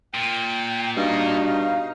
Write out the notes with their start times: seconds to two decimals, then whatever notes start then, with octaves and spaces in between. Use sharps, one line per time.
0.14 A#2 G5
0.97 G2 B2 D#4 F#4 F5